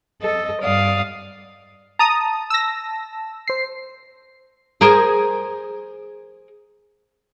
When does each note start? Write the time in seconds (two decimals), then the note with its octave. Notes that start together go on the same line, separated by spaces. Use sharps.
0.21 A4 D#5
0.61 G2 D5 F5 D#6
1.99 A5 A#5 D#6
2.50 E6 A#6
3.48 C5 C7
4.81 G#4 A#4 C5